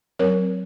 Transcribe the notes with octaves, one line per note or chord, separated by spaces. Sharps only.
F#3 C4 A#4 C#5